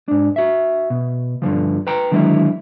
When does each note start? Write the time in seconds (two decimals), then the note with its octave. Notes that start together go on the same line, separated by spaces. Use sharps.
0.08 G#2 D4
0.36 F#4 E5
0.90 B2
1.42 G2 D3 E3 F3
1.87 B4 G5 A#5
2.12 D3 D#3 F#3 G#3 E4